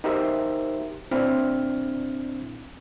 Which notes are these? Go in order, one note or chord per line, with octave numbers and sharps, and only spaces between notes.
D#4 F#4 G4 A#4 C5 E5
A#2 C4 D4 E4 F6